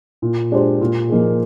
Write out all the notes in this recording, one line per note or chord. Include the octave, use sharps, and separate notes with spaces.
A#2
G#3 D4 G4 C5
A#2
F3 A#3 D#4 G#4